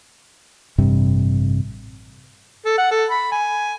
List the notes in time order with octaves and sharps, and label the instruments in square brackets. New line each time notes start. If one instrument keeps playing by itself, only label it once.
[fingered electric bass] A1 G2 C3 G3
[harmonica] A4
F#5
A4
B5
G#5